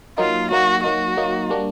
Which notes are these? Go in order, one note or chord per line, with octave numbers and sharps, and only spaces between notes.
F#3 A#3 D#4 F4
F#3 A#3 D#4 F#4
F#3 A#3 D#4 F#4
F#3 A#3 D#4
G3 A#3 D4